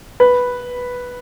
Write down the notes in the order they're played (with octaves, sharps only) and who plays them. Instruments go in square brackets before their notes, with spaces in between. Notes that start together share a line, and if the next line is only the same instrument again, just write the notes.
[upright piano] B4